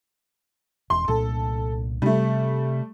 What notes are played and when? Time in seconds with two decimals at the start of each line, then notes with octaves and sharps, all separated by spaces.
0.90 E1 C6
1.08 C2 A#2 D4 A4
2.02 C3 G3 A3